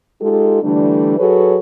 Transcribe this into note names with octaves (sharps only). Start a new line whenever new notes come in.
G#3 D#4 F4 G4 A4
D3 E3 G3 A3 D4
F#3 F#4 G#4 A4 B4 C#5